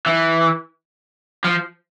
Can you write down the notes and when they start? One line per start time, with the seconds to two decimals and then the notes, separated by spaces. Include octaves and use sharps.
0.06 E3
1.44 F3